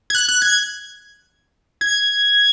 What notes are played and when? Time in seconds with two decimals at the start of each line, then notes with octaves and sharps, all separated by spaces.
0.10 G#6
0.15 F#6
0.28 F#6
0.42 G#6
1.81 G#6